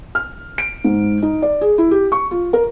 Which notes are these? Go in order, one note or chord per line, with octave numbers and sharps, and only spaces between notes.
F6
D7
G#2
D#4
D5
G#4
E4
G4
C#6
F4
A#4